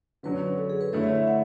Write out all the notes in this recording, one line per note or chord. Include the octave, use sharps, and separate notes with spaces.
D3 F#3 C#4 B4
A4
G#4
B4
D3 A3 E4 C#5
E5
E5
F#5